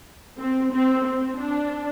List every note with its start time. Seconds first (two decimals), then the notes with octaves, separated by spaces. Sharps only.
0.40 C4
0.73 C4
1.06 C4
1.38 D4